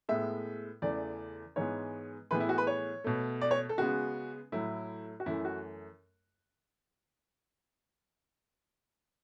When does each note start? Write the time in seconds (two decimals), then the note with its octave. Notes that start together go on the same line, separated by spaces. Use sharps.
0.09 A2 G#3 B3 E5
0.82 E2 C#3 E3 A3 D5
1.56 G#2 E3 G#3 B3 C#5
2.31 A2 E3 G#3 B3 B4
2.40 E4
2.49 F#4
2.58 B4
2.67 C#5
3.04 B2 A3
3.41 D5
3.51 C#5
3.69 A4
3.78 C#3 G#3 B3 F#4
4.52 A2 F#3 A3 E4
5.20 F#4
5.26 F#2 E3 A3 E4
5.45 F#4